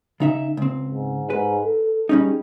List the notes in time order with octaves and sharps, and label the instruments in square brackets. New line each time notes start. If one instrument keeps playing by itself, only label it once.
[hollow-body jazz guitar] C#3 D#4 E5
C#2 C4
[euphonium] G#2
[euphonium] G#2 [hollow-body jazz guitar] B4
[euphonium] A4
[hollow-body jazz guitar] G3 C#4 D#4 [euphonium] G#4